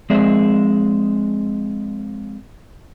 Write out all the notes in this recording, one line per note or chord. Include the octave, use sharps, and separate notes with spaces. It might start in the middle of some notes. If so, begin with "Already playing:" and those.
F3 G#3 C4 G#4 D5 E5